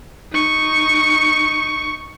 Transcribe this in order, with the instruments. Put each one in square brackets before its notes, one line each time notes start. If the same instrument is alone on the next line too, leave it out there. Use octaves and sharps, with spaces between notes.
[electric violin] D#4 C#6